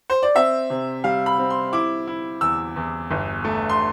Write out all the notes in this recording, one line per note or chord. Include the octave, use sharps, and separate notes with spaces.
C5
D5
C4 E5
C3
G3 F5
B5
C4
C6
E4 D6
E4
E2 E6
E2
G1
A3
C6